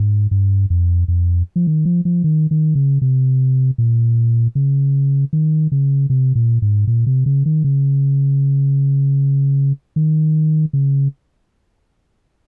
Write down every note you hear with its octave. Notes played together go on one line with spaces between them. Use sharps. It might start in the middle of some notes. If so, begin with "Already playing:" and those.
Already playing: G#2
G2
F2
F2
F3
D#3
F3
F3
D#3
D#3
C#3
C3
A#2
C#3
D#3
C#3
C3
A#2
G#2
A#2
C3
C#3
D#3
C#3
D#3
C#3